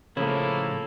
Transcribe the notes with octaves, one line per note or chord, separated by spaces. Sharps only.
A2 C#3 F3 A#3 E4 A4